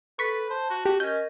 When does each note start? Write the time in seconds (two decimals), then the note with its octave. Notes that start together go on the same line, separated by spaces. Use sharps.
0.19 A4 B4 C#6 B6
0.50 C5 A5
0.70 F#4
0.85 F#4 G4
1.00 C#4 A#4 D#5 G6